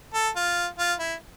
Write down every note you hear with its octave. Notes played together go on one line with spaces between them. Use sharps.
A4
F4
F4
E4